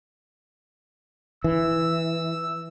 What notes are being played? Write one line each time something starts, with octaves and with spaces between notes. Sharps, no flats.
E3 E6